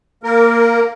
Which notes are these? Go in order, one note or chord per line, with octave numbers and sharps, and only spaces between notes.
A#3 A#4